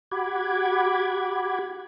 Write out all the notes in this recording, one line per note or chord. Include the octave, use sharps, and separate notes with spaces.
F#4 G4 F#5 B5 D6 G#6